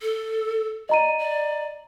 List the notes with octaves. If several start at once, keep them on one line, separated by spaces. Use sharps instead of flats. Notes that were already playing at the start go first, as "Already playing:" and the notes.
A4
D5 D#5 A#5 D#7
D5